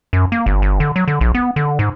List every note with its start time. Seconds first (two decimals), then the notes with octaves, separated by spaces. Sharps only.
0.13 F#2
0.32 A#3
0.46 G1
0.62 G1
0.80 D3
0.96 F#3
1.08 D3
1.21 A#1
1.35 B3
1.56 D3
1.79 G#2